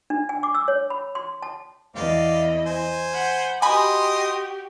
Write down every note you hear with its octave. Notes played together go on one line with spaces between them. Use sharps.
D4
G#5
D6
E6
C#5
B5
C6
A5
E2 E4 D5 D#5 F5
C5 G#5
F#5 B5 G6
F#4 G4 D#5 G#5 B5 C6 D#6